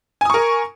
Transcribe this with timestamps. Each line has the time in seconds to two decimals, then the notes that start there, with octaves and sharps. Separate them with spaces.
0.21 G#5
0.25 D#6
0.30 C#6
0.34 A#4